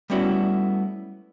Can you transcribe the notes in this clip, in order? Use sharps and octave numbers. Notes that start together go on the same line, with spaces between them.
G3 A3 B3 C#4 E4 F#4